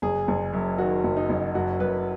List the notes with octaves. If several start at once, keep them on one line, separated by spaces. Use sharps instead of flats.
F#1 G#4
F#1
F#2
D#3 F#4
F#1
D#4
F#1
F#2 F#4
F#2 B4